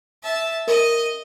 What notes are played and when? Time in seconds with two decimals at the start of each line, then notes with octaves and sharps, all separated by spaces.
0.23 E5 A5
0.67 A#4 D#5